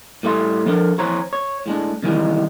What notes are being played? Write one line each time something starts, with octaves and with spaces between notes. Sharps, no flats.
A2 G3 A4 E5 C6
F3 D4 A4 A#4
F2 E3 C5 C#5 A#5
C#5
A2 G#3 D4
C3 D#3 E3 G3 G#3